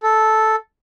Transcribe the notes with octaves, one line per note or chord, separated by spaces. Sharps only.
A4